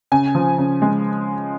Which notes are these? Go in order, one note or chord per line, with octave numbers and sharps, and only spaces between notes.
C#3 G#5
F3
C#3
G#3